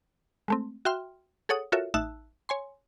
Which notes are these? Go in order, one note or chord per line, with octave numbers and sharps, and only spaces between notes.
G#3 A3 C4
F#4 E5 G5 C6 F6
G#4 A4 C#5 F#5 D#6
F4 F#4 A4 A#4 C#5 E5
A1 D#4 E5 A5 E6 F#6
C#5 G#5 C6